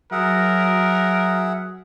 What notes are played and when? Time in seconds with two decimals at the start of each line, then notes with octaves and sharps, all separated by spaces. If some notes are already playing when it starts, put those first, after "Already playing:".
0.12 F#3 G#4 A#4 E5 F#5